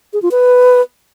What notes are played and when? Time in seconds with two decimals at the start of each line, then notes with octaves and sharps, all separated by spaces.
0.13 G#4
0.22 F4
0.31 B4